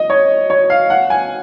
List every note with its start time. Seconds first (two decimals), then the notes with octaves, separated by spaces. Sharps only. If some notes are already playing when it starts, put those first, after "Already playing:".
Already playing: D#5
0.10 C#5
0.50 C#5
0.70 F5
0.90 F#5
1.10 G#5